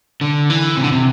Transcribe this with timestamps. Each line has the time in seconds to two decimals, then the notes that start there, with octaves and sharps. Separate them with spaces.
0.21 D3
0.50 E3
0.77 C3
0.84 D3
0.92 C3